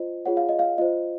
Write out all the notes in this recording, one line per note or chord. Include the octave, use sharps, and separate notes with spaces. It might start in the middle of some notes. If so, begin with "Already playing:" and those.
Already playing: F4 C5 D#5
F4 G#4 C#5 F#5
F5
D#5
F5
F4 C5 D#5